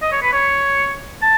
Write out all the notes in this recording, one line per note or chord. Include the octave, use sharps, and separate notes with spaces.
D#5
C#5
B4
C#5
A5